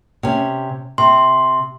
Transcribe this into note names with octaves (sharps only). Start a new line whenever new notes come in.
C3 C#4
C3 C6